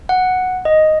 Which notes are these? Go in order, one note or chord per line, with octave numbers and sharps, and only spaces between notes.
F#5
D#5